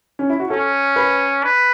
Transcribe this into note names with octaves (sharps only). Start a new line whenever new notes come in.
C#4
E4
F#4
C#4 A4
B4
B4